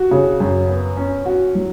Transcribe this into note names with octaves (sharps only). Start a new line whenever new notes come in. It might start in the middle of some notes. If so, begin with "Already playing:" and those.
Already playing: F#4
C#3
F#2
B3
C#4
F#4
F#3